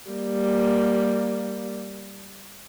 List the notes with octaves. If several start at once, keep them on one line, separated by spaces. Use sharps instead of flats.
G3 A#3